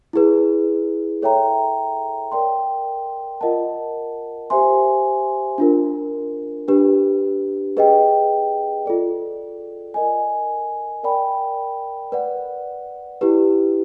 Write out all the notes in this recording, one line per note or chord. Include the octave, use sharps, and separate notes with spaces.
E4 G#4 B4
A4 C#5 E5 G5 A#5
A#4 D5 G5 C6
F4 A#4 D#5 F#5 A5
G4 C5 E5 G#5 C6
D4 F4 A#4
D4 G4 B4
G#4 B4 D#5 G5
F4 A4 D5
A#4 D#5 G#5
A#4 D5 G5 B5
B4 D5 F#5
E4 G4 B4